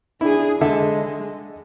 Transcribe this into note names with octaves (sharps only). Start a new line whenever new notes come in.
D4 E4 G#4
D3 G#3 A4 E5